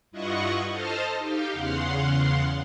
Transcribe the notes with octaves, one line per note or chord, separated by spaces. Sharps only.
G2 E4 F4 D#5 F#5 C#6
A4 C5 D#5 A5 F6
D#4 G4 F5 G5
E2 C#3 F5 F#5 C6